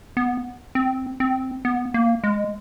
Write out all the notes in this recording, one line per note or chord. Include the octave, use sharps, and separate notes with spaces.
B3
C4
C4
B3
A#3
G#3